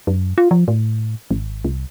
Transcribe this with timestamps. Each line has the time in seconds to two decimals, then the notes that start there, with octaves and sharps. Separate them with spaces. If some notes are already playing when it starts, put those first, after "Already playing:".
0.07 F#2
0.38 F4
0.51 F3
0.68 A2
1.31 G#1
1.65 C2